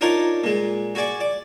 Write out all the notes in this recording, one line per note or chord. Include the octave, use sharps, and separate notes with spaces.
D4 D#4 F4 A#4 C#5 D5
A#2 G#3
F#4 G#4 D5 C#6
D5